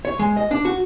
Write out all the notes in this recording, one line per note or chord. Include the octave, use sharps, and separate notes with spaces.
C#5
G#3
D#5
D4
F#4